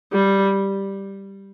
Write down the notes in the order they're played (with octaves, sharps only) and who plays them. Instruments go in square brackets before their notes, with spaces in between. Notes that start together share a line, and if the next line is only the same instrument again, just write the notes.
[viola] G3